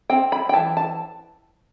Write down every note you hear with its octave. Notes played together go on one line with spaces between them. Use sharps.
C4 G5
B5
G5
E3 A5
A5